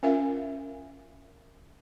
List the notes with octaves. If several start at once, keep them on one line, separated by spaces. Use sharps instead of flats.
C#4 F4 A#4 E5 F5